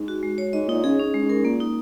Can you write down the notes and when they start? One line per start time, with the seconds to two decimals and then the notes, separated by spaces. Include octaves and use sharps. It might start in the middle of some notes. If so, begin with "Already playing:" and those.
Already playing: G#2
0.08 F#4
0.23 G#3
0.38 C#5
0.53 G#2 D#5
0.68 A#2 D#4
0.84 C#3 G#4
0.99 C#4
1.14 G#3
1.21 G#2
1.29 A#4
1.44 A#2 A#3
1.60 D#4